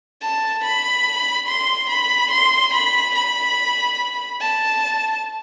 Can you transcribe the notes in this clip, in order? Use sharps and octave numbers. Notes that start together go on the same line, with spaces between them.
A5
B5
C6
B5
C6
B5
B5
A5